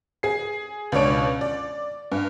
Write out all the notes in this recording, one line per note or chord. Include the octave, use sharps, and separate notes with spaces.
G#4 C7
C#2 B2 D4 C#5 D7
D5
G2